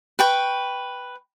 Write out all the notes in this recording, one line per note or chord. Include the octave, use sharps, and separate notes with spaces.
B4 G5 C#6